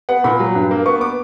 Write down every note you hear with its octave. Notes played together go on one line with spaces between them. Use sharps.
B3 F#5
A#2 B5
F#3
G2
A#3
B3 C#6
D6